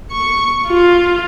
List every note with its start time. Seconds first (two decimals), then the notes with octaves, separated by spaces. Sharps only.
0.12 C#6
0.67 F4